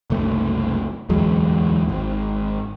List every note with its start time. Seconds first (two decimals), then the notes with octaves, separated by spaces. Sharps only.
0.10 F#1 C2 A3
1.09 D1 E2 F#3 G#3
1.89 G#1